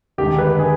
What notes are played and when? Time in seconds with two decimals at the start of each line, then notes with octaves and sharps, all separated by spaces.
0.18 D#2 D3 G#3 G4
0.39 B4
0.59 G#4